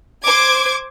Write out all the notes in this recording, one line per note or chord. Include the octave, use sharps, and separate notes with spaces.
C5 D6 G#6